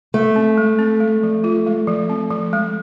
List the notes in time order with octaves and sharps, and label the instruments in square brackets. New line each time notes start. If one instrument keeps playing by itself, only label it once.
[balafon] G#3 [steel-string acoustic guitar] A3
[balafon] C4
G#3
C4
G#3
F3
F4
G#3
F3
C4
F3
G#3